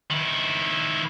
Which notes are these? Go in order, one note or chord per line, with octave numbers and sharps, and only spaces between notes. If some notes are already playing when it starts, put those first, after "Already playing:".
D#3 E4